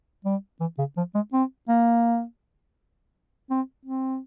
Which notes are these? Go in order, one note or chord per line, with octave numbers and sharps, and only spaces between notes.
G3
E3
C#3
F3
G#3
C4
A#3
C4
C4